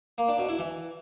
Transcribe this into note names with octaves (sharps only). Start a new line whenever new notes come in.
A#3
D4
B2
E4
E3